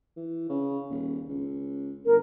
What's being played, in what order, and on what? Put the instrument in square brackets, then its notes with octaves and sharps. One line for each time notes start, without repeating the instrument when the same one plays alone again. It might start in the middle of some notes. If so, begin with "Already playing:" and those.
[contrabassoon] E3
C#3
D#1
C#2
[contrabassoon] G1 [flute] A#4